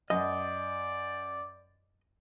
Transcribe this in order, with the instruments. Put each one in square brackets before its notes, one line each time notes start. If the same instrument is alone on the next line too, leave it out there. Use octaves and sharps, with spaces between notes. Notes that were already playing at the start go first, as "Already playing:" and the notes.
[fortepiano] F#2 [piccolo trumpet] D5 [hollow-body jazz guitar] D#5